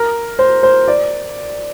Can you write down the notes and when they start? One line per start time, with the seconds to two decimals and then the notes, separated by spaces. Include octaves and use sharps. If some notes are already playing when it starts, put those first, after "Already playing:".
Already playing: A#4
0.39 C5
0.63 C5
0.88 D5